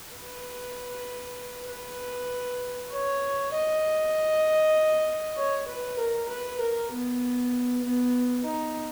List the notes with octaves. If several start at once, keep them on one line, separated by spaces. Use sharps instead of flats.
B4
B4
C#5
D#5
C#5
B4
A#4
B4
A#4
B3
B3
D#4